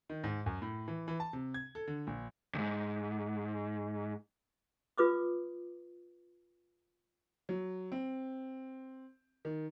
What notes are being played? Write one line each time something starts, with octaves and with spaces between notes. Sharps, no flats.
D#3
G#2
F#2
A2
E3
E3
A5
C3
G#6
A4
D3
A#1
D#2 G#2
F4 B4 D6 D#6
F#3
C4
D#3